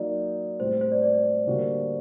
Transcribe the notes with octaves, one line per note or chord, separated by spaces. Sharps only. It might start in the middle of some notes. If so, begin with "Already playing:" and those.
Already playing: F#3 A#3 D#4 D5
A2 G3 C4 C5
C5
D5
D5
D3 G3 A#3 F#4